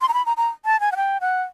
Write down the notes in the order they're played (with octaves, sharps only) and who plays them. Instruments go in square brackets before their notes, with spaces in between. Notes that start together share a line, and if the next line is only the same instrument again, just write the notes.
[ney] C6
A#5
B5
A#5
A#5
A5
G#5
F#5
G5
F#5